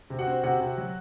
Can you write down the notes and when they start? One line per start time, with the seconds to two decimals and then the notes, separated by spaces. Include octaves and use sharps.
0.10 C3
0.19 F#4 F#5
0.27 C4
0.43 C3 F#4 F#5
0.60 C3
0.77 F#3